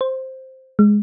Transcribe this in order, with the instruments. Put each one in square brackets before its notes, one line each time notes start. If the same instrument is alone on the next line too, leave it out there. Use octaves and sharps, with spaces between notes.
[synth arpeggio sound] C5
G#3